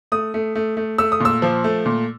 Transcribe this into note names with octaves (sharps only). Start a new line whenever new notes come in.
A3 D#6
A3
A3
A3
A3 E6
D#6
A#2 E6
F3
A3
A#2